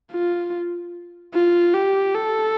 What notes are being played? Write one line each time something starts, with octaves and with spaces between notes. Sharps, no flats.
F4
F4
G4
A4